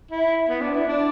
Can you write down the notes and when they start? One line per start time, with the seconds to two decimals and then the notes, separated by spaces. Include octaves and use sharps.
0.11 E4
0.49 B3
0.61 D4
0.74 E4
0.88 D4